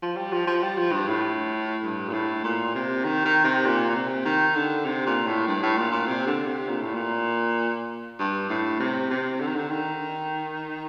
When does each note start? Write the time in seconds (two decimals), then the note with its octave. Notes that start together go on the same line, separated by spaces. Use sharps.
0.02 F3
0.16 G3
0.33 F3
0.47 F3
0.63 G3
0.78 F3
0.92 G2
1.08 A2
1.84 G2
2.09 A#2
2.13 A2
2.44 A#2
2.75 C3
3.04 D#3
3.25 D#3
3.44 C3
3.66 A#2
3.90 A#2
3.95 C3
4.25 D#3
4.56 D3
4.86 C3
5.07 A#2
5.26 A2
5.47 G2
5.62 A2
5.78 A#2
5.92 A#2
6.07 C3
6.27 D3
6.47 C3
6.68 A#2
6.81 A2
6.94 A#2
8.19 G2
8.49 A2
8.80 C3
9.10 C3
9.40 D3
9.47 D#3
9.55 D3
9.70 D#3